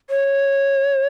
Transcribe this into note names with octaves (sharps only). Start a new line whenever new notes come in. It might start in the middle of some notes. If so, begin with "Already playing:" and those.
C#5